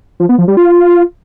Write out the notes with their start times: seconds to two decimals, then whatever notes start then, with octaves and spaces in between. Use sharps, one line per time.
0.20 F3
0.29 B3
0.38 F3
0.48 G3
0.57 F4